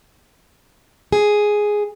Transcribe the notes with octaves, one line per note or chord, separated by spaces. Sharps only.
G#4